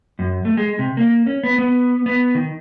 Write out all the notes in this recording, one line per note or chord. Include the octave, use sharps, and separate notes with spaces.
F#2
A3
G#3
C3
A#3
C#4
B3
B3
B3
D#3